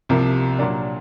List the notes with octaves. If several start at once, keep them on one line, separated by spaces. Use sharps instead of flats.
C2 C3 F3 A#3
A#2 F#3 A#3 D4